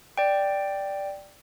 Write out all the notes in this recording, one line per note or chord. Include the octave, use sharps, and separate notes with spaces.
D5 G5